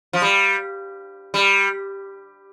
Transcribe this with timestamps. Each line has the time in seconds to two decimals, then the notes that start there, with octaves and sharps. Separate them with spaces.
0.13 F3
0.22 G3
1.34 G3